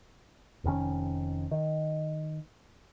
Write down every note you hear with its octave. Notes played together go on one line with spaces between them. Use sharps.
F1 F2 D#3 C#4
D#3